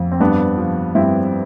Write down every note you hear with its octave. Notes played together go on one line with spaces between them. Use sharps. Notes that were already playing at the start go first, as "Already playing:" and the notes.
Already playing: F2
C4
G2 B3 D4
F3
G2 C4 E4